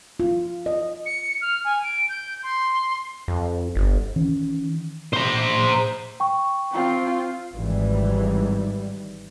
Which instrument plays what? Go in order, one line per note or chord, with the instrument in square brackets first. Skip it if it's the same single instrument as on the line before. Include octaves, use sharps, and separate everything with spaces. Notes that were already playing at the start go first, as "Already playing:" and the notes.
[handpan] F4
D#5
[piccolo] C#7
F6
G#5
D7
G6
C6
[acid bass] F2
G1
[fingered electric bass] D#3 E3 C#4
[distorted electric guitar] C5 A#5
[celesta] G5 C#6
[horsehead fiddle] C4 F4
[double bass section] G#1 G#2 E3 G3